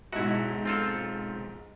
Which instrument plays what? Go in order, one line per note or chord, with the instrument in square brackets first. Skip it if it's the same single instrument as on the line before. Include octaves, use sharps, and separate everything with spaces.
[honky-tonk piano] B1 G#2 [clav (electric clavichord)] E4 F#4
[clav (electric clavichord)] C4 F4 A4